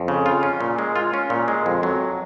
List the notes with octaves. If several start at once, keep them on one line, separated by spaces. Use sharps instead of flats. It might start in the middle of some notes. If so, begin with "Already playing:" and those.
Already playing: F2
C#3
F4
C#4
A#2
G#3
F4
C#4
A#2
G#3
F2
F#3